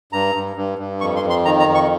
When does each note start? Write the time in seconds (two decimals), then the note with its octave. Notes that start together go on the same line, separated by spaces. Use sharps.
0.13 G2 A#5
0.35 G2
0.56 G2
0.79 G2
1.01 F2 C#6
1.16 C6
1.23 F2
1.30 C6
1.45 D#3 A#5
1.60 A#5
1.68 F2
1.75 C#6